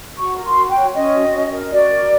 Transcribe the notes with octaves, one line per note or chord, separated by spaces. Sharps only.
F#4 C#6
A#4
C6
F#4
G5
C#5
C#4 D#5
F#4
C#4
A#4
F#4 D5
A#4